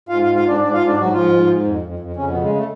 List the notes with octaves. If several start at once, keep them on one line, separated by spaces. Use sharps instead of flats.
G#2 F4 F5
F4 F5
G#2
F4 F5
G#2 D4 D5
G#2 D4 D5
G#2 F4 F5
D4 D5
G#2 F#3 F#4
G#2 F3 F4
G#2
G#2
F2
F2
F2
F2 C#3 C#4
B2 B3
C#3
G#3
A3